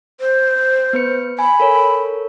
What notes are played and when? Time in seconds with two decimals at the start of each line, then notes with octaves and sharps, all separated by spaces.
0.21 C5
0.93 B3 B4 C#7
1.39 G#5 B5
1.60 A4 A#4 C#5